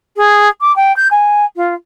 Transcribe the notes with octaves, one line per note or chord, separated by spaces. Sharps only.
G#4
D6
G5
G6
G#5
F4